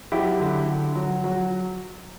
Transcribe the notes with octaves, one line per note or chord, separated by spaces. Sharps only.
F#3 E4 G4
D3
D3
F#3
F#3